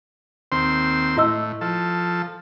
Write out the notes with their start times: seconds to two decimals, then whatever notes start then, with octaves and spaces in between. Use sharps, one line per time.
0.52 D#2 C4 C6
1.17 A2 E4 D#5 E6
1.61 F3 A4